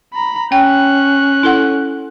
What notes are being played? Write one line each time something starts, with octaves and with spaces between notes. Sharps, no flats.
A#5 B5
C#4 G5 F#6
E4 A4 F#5